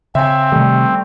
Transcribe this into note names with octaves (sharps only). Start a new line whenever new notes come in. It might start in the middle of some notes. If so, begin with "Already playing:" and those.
C#3 C4 E5 G#5
C3 D#3 G3 A3